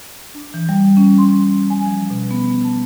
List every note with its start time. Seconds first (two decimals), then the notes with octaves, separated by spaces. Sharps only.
0.35 D4
0.54 E3
0.69 G3
0.97 C#4
1.18 C6
1.34 C#4
1.70 G#5
1.86 F3
2.10 B2
2.31 B3
2.64 A5